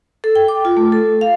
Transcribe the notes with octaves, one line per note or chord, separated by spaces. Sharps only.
A4
G5
D6
F4
A3
A4
F5